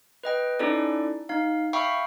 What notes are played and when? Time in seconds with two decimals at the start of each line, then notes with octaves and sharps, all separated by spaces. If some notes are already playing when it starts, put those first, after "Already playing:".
0.24 B4 D#5 G5
0.59 C#4 D#4 E4 A4 D5
1.29 D#4 F5
1.73 E5 F5 G5 B5 C#6